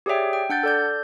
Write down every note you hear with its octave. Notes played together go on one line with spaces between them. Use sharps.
G4 G#4 C#5 D5 E5 G5
G5
D4 F#5 G6 A6
A4 D5 G6